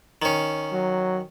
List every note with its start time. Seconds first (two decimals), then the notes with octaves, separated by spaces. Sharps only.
0.22 D#3 C#4
0.73 F#3